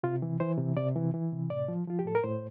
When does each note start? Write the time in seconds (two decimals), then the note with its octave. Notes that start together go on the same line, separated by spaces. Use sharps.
0.03 C3 F4
0.22 E3
0.40 E3 C5
0.58 C3
0.77 C3 D5
0.96 E3
1.14 E3
1.32 C3
1.50 A2 D5
1.68 F3
1.87 F3 F4
1.99 G4
2.05 A2 A4
2.15 A#4
2.24 A2 C5